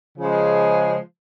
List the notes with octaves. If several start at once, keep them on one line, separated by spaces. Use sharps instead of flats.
C#3 F3 G#3